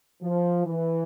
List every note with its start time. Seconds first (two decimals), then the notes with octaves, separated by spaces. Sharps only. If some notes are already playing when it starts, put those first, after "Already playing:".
0.22 F3
0.65 E3